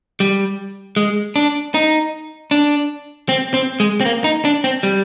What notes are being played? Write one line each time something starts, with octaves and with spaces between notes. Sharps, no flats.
G3
G#3
D4
D#4
D4
C4
C4
G#3
C4
A#3
D#4
D4
C4
G3